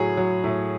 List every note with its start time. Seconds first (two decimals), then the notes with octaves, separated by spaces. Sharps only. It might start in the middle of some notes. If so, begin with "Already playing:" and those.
Already playing: A2 F#3 G#4
0.17 F#3
0.44 A2